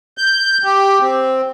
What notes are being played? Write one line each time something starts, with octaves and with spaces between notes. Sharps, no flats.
G6
G4
C4